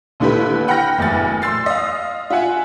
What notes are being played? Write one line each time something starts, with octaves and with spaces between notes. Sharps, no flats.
D#2 D3 E4 G4 B4
F#5 G5 B5 F6 A#6
F#1 E2 A2 A6
C6 E6 A6 C7
D#5 F5
F4 E5 F#5 G#5